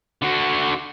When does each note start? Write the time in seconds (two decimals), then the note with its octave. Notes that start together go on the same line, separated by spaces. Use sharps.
0.22 D3 F#4